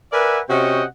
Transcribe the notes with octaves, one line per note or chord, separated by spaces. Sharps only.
A#4 B4 D5 E5 F#5 G#5
C3 C#4 F#4 D#5 F#5 G5